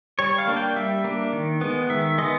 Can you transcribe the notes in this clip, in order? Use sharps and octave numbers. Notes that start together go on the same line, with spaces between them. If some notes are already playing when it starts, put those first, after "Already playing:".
G3 C#5
F5
A#3 D4
G5
G3 E5
A#3 D4
D#3
G#3 B3
D#3 E5
G#3 B3 D#5